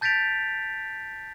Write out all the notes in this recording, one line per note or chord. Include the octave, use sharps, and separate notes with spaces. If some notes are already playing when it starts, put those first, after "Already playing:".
A5 G6 A6 B6 D7 F7